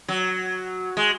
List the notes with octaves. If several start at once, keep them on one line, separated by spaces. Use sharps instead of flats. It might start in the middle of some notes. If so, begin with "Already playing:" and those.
F#3
G#3